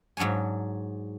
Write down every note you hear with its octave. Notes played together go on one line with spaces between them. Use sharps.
G#2 F#3 D4 C#5 G#5